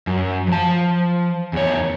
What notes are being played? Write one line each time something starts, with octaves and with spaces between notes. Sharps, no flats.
F#2
F3 A5
E2 C#5